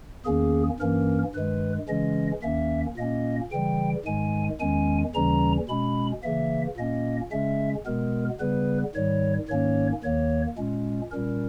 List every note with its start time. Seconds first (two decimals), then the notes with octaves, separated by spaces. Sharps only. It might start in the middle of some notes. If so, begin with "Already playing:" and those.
0.25 E2 D#3 A#3 C#4 G#4
0.79 G2 E3 A#3 C#4 A#4
1.34 G2 D#3 G#3 B4
1.88 C#3 E3 G#3 C#4 D#5
2.42 D#2 D#3 A#3 C#4 E5
2.97 A#2 A#3 C#4 D#5
3.52 C#3 E3 G3 G5
4.05 G#2 D#3 G#3 G#5
4.60 E2 D#3 G#3 C#4 G#5
5.15 D#2 C#3 E3 G3 C#4 A#5
5.69 B2 G#3 C#4 B5
6.23 C#3 E3 A#3 E5
6.77 A#2 A#3 C#4 D#5
7.31 C#3 G#3 C#4 E5
7.85 B2 G#3 B3 A#4
8.40 C#3 G3 B3 B4
8.95 G#2 D#3 G3 C#5
9.49 G#2 D#3 A#3 C#4 C#5
10.03 D#2 D#3 A#3 C#5
10.58 A#2 G#3 C#4
11.12 A#2 G3 C#4 A#4